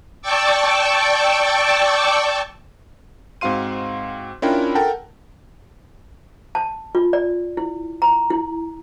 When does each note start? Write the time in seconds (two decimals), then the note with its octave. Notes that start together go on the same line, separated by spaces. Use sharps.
0.22 D5 G5 A5 C#6 D6 E6
3.41 G#2 C4 F#4 F5 C6 D#7
4.42 C#4 D4 E4 F4 A#4 G5
4.75 A4 A#4 F#5 G5 A5
6.55 A5
6.95 F4
7.13 D5
7.57 E4
8.02 A#5
8.30 E4